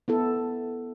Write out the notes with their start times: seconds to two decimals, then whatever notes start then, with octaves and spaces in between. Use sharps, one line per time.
0.08 B3 E4 A4